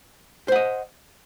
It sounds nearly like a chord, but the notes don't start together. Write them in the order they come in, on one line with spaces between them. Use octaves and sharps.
C5 F#5 D#5